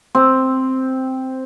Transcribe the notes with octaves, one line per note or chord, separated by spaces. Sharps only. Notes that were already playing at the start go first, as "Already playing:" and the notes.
C4